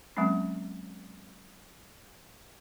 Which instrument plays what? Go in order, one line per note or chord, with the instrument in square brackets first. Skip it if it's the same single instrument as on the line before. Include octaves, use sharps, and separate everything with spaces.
[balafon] F#3 G#3 A#3 C4 C#4